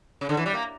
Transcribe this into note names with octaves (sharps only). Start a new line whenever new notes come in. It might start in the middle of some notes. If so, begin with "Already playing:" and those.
C#3
D3
E3
G3
A#3